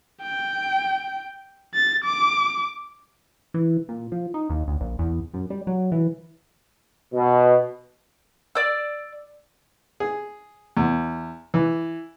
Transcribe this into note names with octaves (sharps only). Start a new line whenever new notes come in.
G5
A6
D6
E3
A#2
F3
D#4
D#2
D2
A#1
E2
F#2
G3
F#3
E3
B2
D5 E6
G#4
E2
E3